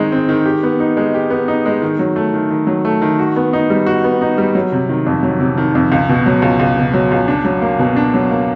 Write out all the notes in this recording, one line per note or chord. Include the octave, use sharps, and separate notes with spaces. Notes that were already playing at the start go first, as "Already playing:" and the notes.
Already playing: D#3 G#3 C4 D#4
C4
D#3
G4
B3
D#4
G#3
G4
B3
D#4
G#3
D#3
F#3
A3
D#3
D#3
F#3
A3
D#3
F#4
B3
D#4
G3
F#4
B3
D#4
G3
F#3
C3
D#3
F2
F#3
C3
D#3
F2
C#2
B2
F#3
C#2
C#2
B2
F#3
C#2
D4
F#3
A#3
B2
D4
F#3
A#3